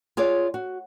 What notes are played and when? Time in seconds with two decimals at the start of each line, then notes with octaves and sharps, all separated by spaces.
0.17 F4 G#4 C#5 D5
0.54 F#4